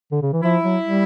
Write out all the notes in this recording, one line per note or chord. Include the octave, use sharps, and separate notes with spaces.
D3
C#3
E3
F3 E4
F#3
G3